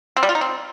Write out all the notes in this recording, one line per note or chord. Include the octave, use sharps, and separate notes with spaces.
C4
G3
F4
D#4
C4